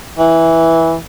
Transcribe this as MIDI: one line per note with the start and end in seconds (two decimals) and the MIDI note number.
0.18 0.96 52